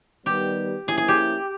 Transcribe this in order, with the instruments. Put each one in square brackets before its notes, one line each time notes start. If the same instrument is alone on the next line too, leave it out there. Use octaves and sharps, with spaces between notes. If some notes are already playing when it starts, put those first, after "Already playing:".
[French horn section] D#3 G3 B3 [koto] G4
[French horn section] F3 A#3 C#4 E4 [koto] G#4
[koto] G#4
G4